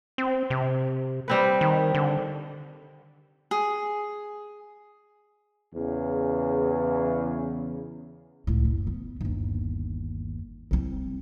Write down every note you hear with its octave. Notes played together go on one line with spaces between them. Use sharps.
C4
C3
G3 C4 B4
D#3
D3
G#4
E2 C#3
C#2 A2
F#1
B3
G1 D#2
C2 C4